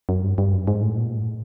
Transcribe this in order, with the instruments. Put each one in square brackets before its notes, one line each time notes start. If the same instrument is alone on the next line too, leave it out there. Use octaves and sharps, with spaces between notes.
[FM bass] F#2
G2
G2
F#2
G#2
A2
A#2
A2